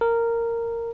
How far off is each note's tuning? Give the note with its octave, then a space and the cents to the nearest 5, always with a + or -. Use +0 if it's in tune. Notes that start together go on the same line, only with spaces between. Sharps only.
A#4 -10